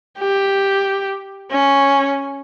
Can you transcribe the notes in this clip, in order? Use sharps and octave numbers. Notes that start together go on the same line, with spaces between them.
G4
C#4